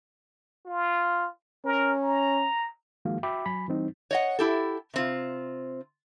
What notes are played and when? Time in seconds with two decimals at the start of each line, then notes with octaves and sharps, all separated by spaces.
0.66 F4
1.65 C#4 A#4
2.03 A#5
3.05 D#3 F3 G#3 A#3 F#4 F5
3.23 F#4 E5 G5 B5 D6
3.46 F#3 G#5 B5
3.68 E3 G3 C4 D#4
4.11 C#5 D#5 F#5
4.39 E4 G4 A4
4.94 C3 C4 F4